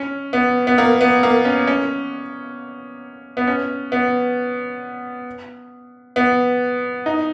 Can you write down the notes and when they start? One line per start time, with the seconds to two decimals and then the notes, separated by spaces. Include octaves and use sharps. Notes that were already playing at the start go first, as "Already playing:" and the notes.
Already playing: C#4
0.33 B3
0.67 B3
0.78 A#3
1.01 B3
1.23 A#3
1.45 C#4
1.67 C#4
3.37 B3
3.47 C#4
3.92 B3
6.16 B3
7.06 D#4